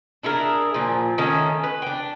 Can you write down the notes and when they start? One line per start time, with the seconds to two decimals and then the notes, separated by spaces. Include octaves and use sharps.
0.23 D4 E4 G#4 A#4
0.74 A#2 F3
1.18 D#3 A3 C#4
1.64 B4
1.82 D4 G5